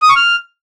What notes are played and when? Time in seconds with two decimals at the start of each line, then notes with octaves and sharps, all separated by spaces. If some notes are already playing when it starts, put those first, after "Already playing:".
0.02 D#6
0.09 C#6
0.16 F6